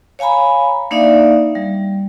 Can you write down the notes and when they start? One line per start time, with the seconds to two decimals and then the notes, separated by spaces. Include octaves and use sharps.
0.19 C#5 F5 G#5 A#5 B5
0.91 A#3 D4 D#4 D5 E5 F5
1.55 G3